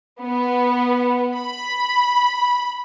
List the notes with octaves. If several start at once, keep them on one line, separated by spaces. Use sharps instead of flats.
B3
B5